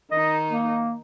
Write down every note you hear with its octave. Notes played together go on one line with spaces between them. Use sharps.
D#3 D#4 D#5
A#3